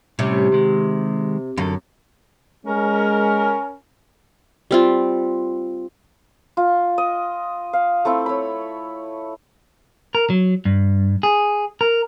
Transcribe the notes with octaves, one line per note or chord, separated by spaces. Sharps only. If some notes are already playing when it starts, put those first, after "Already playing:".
A2 C3 G3 C#4
D#3 G#3
F#2 D3 A4
G#3 C#4 A#4
G3 C4 F4
F4
D#5
F5
A3 C4 E4
C#5 B5
A#4
F#3
G2
G#4
A#4